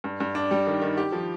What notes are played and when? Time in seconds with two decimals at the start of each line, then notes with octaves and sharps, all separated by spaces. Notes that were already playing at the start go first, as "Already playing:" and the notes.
0.04 G2
0.20 G2
0.35 D4
0.51 G3
0.67 D#3
0.82 D#3
0.97 G4
1.12 F3